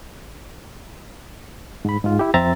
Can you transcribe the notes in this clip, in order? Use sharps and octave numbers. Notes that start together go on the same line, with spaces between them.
G#2 B5
G#2 F4
E4 G4
F2 C4 E5 A#5 A6